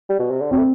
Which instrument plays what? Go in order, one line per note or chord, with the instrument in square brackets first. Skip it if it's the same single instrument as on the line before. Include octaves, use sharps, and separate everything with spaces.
[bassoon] G3
B2
C3
D3
[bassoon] F#3 [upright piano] C4
[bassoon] A3